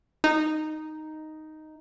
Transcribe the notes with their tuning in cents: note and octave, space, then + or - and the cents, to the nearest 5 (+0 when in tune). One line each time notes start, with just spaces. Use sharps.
D#4 +0